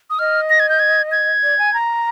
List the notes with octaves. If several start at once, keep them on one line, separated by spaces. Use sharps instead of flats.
D#6
D#5 F6
A#6
G#6
G6
G#6
G#6
D5
G#5
A#5